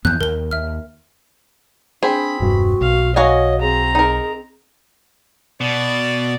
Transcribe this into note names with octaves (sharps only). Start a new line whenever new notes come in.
F2 E3 B3 F#6 G6
D#2 A#4 G7
D#2 E5 F6
C4 D4 G#4 B5
E1 G2 F#4
B1 F5
F#4 C#5 D#5 F5 G#5
C4 G#4 A#5
D#4 G#4 A#4
B2 D5